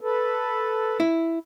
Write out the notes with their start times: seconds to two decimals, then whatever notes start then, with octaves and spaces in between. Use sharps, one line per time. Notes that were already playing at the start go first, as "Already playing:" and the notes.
0.01 A4 B4
1.00 E4